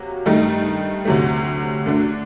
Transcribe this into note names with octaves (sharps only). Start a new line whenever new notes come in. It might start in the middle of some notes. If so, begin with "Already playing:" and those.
Already playing: C3 F#3 A#3 F#4
G2 D#3 A3 D#4
D2 C3 F#3 A3
D3 A3 D4 F#4